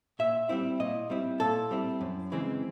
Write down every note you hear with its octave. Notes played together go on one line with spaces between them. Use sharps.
A#2 E5
G3 C4 E4
A#2 D#5
G3 C4 E4
A#2 A4
G3 C4 E4
F#2
C#3 E3 G#3 C4